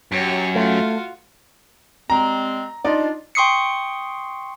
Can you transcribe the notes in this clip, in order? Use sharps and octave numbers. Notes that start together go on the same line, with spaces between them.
F#2 G4 C#5
A3 F4 F#4
G3 G#3 C4 A#5
D4 D#4 F4 D5
G5 C6 C#6 D#6 C7 C#7